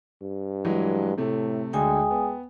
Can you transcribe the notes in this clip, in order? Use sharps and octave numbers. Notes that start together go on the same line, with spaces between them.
G2
E3 F#3 G#3
A2 C3 A3
D2 D3 G#3 G5 G#5 D#6
B3